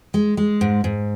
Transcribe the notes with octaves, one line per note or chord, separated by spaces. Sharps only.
G#3
G#3
G#2
G#2